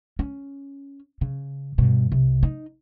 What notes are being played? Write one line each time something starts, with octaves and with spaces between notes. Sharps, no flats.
C#4
C#3
G2 B2
C2 C3
D#4